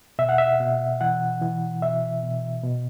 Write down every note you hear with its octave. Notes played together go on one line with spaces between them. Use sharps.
B2 E5
F#5
E5
B2
E3 F#5
E3
B2 E5
B2
B2